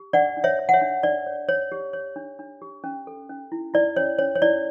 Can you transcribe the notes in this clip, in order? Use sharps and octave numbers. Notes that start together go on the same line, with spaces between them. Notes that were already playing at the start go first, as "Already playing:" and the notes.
Already playing: G4
D4 D5 F#5
D4
C#5 E5
C#5
F#5
C#5 E5
D4
D4 D5
C#5
C#5
G4
C#5
D4
D4
G4
C#4
A4
C#4
E4
E4 D5
C#4 C#5
C#4 C#5
C#5
E4 D5